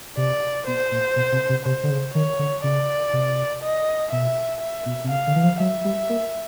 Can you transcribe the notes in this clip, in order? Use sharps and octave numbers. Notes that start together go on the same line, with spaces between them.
C3 D5
B2 C5
A#2
B2
C3
C3
C3 C5
D3
C#3
D#3 C#5
D3
C#3 D5
C3
D#5
B2 E5
E5
B2
C3
C#3 F5
D3
E3
F3
F#3 E5
G3
A#3